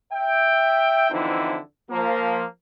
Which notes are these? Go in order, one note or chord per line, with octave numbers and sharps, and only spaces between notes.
E5 G5
D3 E3 F3 C4 D#4 E4
F3 A#3